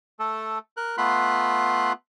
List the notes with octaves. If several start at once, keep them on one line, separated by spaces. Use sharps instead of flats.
A3 A4
A#4 F#6
A3 B3 F4 B5 C6 F#6